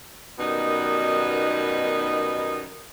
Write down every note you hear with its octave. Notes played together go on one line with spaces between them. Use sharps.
F#2 B2 D#3 G3 B3 D#4